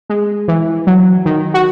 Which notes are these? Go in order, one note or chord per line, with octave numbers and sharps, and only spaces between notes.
G#3
E3
F#3
D#3
F#4